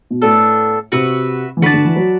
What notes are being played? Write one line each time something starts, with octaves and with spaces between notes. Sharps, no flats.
B2
A2 B3 D4 A4
C3 F#4 B4 E5
E3
D3 F#4 B4 D5 A5
D3
E3
F#3